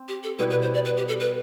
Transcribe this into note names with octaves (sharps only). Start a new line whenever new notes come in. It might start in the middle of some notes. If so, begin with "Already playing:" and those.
Already playing: C4
G4
A4
B2 G3 B3 E4 B4
B4
C5
D5
B4
G4
A4
B4